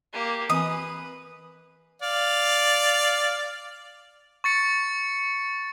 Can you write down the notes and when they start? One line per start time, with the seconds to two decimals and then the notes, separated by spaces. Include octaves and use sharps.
0.13 A#3 G4
0.50 E3 C4 B4 G#5 D#6
2.02 D5 F5
4.44 C#6 A6 C#7